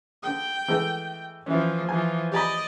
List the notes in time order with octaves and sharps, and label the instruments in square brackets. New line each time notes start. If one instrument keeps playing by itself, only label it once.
[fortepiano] D3 D#6 [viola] G5
[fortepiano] E3 G#3 A3
[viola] E3 F3 [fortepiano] C#4 E4
[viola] E3 F3 [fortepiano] G#5
[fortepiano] G4 G#5 B5 [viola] D5 D#5